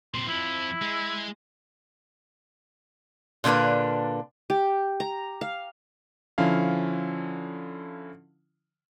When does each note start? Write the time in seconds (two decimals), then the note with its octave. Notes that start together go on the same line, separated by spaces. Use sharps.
0.14 A#2 C4 C6
0.28 F2 F3 E4
0.82 G#3
3.44 A#2 D3 A#3 D4 B4
4.50 G4
5.00 A#5
5.41 F5
6.38 D3 F3 C#4 E4 F5